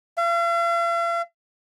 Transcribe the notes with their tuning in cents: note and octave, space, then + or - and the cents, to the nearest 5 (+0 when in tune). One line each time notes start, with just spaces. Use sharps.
F5 -45